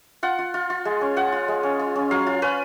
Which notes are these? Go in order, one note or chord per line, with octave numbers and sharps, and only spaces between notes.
F4 F#5
F4
F4
F4
G#3
C#4
F4 F#5
F4
G#3
C#4
F4
C#4
F#3 F5
F4
C#4 B4